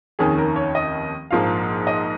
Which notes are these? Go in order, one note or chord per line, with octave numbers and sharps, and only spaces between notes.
F1 D#2 D#3 C#4 G#4
A#4
C#5
D#5
A#1 G#2 F3 A#3 F5
D#5